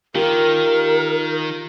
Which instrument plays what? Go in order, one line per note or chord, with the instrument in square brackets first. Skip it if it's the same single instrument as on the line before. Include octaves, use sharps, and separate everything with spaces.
[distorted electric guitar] D#3 [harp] F4 G4 [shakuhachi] A#4